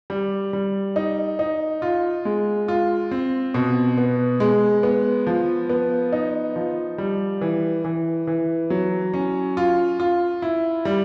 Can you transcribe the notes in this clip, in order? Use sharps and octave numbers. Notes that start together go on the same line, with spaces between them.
G3
G3
D#4
D#4
F4
G#3
F4
C4
B2
B3
G#3
B3
F3
B3
D#4
F3
G3
E3
E3
E3
F#3
C#4
F4
F4
E4
G3